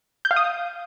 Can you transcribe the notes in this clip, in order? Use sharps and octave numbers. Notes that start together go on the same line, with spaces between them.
G6
F5
D#6